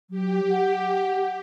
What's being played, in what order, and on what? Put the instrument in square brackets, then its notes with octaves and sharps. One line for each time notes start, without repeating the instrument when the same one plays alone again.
[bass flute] F#3 [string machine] G4
[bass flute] F#5